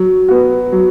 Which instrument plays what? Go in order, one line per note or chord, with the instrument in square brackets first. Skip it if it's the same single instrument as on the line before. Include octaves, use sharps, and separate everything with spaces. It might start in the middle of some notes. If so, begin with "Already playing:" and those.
Already playing: [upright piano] F#3
B3 F#4
F#3